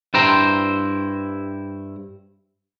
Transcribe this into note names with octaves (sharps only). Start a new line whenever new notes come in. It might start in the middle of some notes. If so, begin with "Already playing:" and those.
G2 E4 C5 G5 A#5